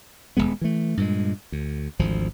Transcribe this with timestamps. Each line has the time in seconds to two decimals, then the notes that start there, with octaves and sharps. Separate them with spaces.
0.37 D#1 G#1 G#3 B3
0.61 E3 A3
0.97 G2 A#2 G#3
1.52 D2
1.99 G#1 D2 F3